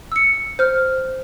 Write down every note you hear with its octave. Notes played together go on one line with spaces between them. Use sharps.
E6 C#7
C5 F6